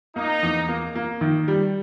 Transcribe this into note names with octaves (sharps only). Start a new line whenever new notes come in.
A#3 D#4
E2
A#3
A#3
D#3
G3